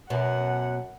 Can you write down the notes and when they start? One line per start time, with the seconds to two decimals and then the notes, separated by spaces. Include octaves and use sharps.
0.10 F#2 B2 F#5